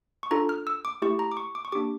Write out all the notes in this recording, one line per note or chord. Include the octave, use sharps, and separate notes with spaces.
C#6
D4 F4 A4 A#5
F6
E6
D6
A3 E4 G4 C#6
A#5
D6
C#6
D6
C#6
A#3 D4 G4 D6